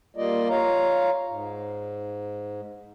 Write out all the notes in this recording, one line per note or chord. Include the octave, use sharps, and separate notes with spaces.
G3 A#3 F4 D5 D#5
F4 C#5 F5 A#5
G#2